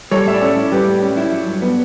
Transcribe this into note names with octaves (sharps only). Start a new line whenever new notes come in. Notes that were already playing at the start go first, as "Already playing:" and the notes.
G3 A4 C#5
A2 E5
D5
C#4 A4 C#5
E4
G3 G4 B4
A2
C#4
E4
F#3
G2
B3